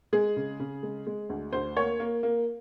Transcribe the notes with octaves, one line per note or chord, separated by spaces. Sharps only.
G#3 G#4
C#3
C#3
G#3
G#3
D2
D2 C5
A#3 C#5
A#3
A#3